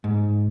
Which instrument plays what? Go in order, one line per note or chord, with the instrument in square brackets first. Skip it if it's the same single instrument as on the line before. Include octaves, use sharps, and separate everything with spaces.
[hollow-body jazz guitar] G#2